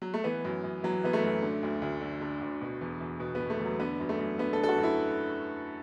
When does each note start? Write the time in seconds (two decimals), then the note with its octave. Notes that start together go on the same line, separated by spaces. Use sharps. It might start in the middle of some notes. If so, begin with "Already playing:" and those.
0.02 F#3
0.14 A3
0.24 E3 B3
0.45 F#2
0.64 F#2
0.83 E3 F#3
1.04 E3 B3
1.13 A3
1.23 F#2
1.42 D3
1.63 D2
1.82 D2
2.01 D3
2.21 D3
2.41 D2
2.61 B2
2.81 E2
3.01 E2
3.20 B2
3.35 B2 B3
3.50 A3
3.59 E2
3.65 F#3
3.80 D3 B3
4.00 F#2
4.09 A3
4.19 F#2
4.39 D3 B3
4.53 A4
4.58 D3
4.63 A4
4.69 F#4
4.78 F#2
4.83 E4